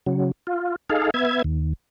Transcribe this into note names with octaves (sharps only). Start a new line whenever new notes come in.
C#3 F#3
F4
D#4 G#4 A4 F5
B3 E5 G#6
D#2